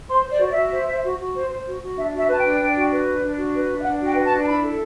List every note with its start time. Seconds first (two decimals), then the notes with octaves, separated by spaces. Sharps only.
0.09 C5 C6
0.25 C5
0.30 D5
0.41 F#4 D5
0.51 F#4 E5
0.72 C5
0.88 C5
1.03 F#4
1.18 F#4
1.34 C5
1.50 C5
1.66 F#4
1.81 F#4
1.97 D4 E5
2.13 F#4 E5
2.28 B4 A5
2.39 G5
2.44 D4
2.59 D4
2.75 F#4
2.91 B4
3.06 D4
3.22 D4
3.38 F#4
3.53 B4
3.69 D4
3.79 E5
3.84 D4 F#5
4.00 F#4
4.06 G5
4.16 B4
4.26 A5
4.31 D4
4.43 A5
4.47 E4 B5
4.63 A4